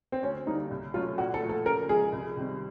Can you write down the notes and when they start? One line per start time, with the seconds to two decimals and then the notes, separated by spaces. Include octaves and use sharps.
0.12 C4
0.23 D2 C#4
0.47 D3 G3 A#3 D4 D#4
0.71 C2
0.94 B2 F#3 A3 C#4 F4
1.18 A#2 F#4
1.34 A4
1.42 F3 A3
1.49 A4
1.65 C#3 A#4
1.88 F3 G#3 G#4
2.12 C2
2.37 C3 D#3 G3 C4